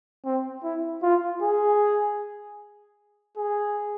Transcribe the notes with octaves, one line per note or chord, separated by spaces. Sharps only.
C4
E4
F4
G#4
G#4